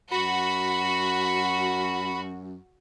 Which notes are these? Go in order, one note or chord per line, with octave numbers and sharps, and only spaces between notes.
F#2 F#4 B5